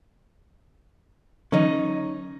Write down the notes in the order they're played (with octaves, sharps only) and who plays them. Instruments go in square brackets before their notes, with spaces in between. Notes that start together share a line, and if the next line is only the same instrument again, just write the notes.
[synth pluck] D3 E3 F#3 [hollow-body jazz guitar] C#4 D#4